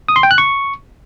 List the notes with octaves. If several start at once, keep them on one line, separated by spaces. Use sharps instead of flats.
D#6
C6
G5
F#6
C#6